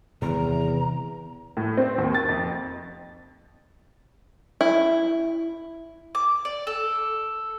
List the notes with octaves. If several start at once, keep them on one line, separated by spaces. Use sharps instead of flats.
E2 C3 D#3 G3 A#5
A2
C4
D#2
A6
F2
E4
D6
D5
A4